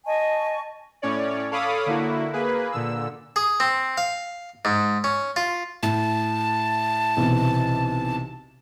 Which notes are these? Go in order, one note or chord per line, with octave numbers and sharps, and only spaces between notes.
D#5 G#5 A5 C#6
A2 C#4 C#5 D5
A4 C#5 F5 B5 D6 D#6
D3 A#3 E4 F#4
A#3 G#4 B4
A#2 D3 E6
G#4
C4
F5
G#2
C#4
F4
A2 A5
B1 C3 E3